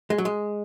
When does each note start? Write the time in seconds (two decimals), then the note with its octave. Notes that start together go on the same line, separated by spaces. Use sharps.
0.10 G#3
0.18 F#3
0.25 G#3